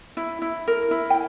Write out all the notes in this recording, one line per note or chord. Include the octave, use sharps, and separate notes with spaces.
E4
E4
A#4
E4
G5